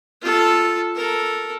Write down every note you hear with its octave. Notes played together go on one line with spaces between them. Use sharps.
F4 A4
A4 A#4